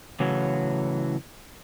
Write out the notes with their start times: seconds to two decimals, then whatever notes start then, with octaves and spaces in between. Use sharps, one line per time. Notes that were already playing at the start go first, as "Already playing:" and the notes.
0.20 A2 C#3 E3 F#3